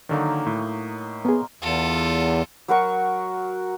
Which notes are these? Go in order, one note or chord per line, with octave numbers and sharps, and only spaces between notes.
D3 D#3 F#3 A#3 D#4
A2
B3 G#4 A#4 C6
E2 F4 A4
F#3 F#4 A#4 C#6